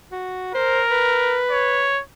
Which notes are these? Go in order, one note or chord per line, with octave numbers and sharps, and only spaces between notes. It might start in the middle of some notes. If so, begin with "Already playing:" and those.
F#4
A#4 C5
B4
C#5